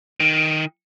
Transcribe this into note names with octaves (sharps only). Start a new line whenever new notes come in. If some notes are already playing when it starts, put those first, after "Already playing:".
D#3